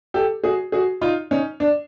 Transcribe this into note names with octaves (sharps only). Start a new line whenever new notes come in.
G4 A4
F#4 G#4
F#4 G#4
D#4 F4
C#4 D#4
D4